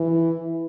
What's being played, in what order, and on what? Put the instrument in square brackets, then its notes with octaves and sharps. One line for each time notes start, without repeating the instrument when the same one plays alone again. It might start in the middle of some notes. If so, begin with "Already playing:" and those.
Already playing: [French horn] E3